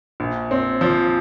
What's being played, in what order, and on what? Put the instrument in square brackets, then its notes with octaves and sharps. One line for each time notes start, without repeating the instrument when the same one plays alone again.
[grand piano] A#1
C4
F3